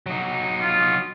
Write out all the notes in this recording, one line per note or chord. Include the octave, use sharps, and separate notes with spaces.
F#3 D#4
F4